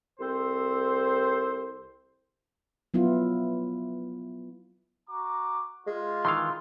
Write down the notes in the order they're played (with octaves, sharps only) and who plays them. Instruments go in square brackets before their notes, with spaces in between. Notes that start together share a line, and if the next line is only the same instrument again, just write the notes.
[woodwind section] C2 C4 A4 C5
[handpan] F#3 B3 E4 F4
[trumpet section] F#4 A#5 D6
[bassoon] G#3 [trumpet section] F4
[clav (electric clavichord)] D#3 E3 F5 [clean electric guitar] C6